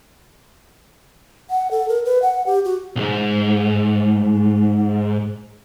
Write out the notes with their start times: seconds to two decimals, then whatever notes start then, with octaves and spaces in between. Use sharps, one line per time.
1.50 F#5
1.71 A4
1.89 A#4
2.05 B4
2.22 F#5
2.46 G4
2.65 F#4
2.96 B1 G#2